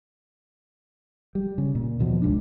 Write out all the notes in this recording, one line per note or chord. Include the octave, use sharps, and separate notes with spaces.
G3
C#3
A#2
D#2 B2 F3
F#1 C#2 G#2 D4